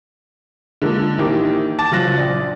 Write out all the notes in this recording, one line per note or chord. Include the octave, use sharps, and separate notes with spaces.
D3 F3 G#3 A#3
A#1 D#3 E3 A#3 G4
A5 D6 A6
F#1 F#3 F4 F#6 A#6
A#1 D5